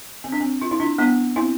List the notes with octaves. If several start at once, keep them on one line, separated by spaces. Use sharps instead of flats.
C4
D4
C4
F4
E4
D4 F4
B3 D4
C4 E4